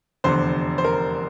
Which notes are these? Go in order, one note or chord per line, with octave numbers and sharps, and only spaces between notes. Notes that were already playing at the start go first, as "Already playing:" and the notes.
F1 E2 D3 C5
C5
A#4